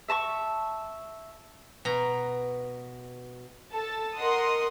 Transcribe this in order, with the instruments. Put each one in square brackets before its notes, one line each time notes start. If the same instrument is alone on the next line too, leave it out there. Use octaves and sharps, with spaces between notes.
[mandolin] E5 A5 A#5 C#6
[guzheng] B2 A#5
[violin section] A4 A5
A#4 D#5 F#5 C6 D#6